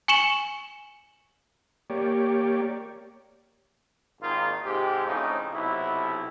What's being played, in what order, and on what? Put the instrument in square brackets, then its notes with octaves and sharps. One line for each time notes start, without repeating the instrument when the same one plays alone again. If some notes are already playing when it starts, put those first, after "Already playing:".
[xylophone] G#5 C#6 C#7 E7 F#7 G7
[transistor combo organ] A#3 G4 C#5 D5
[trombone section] G#1 D#3 A#3 D#4 F4
G#2 C3 G4
A2 C#3 F3 C4 D#4
B1 C3 E4